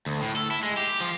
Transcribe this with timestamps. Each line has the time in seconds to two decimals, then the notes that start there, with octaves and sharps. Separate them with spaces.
0.06 D2
0.21 A2
0.36 A4
0.51 E4
0.63 G#3
0.77 G4
1.01 F3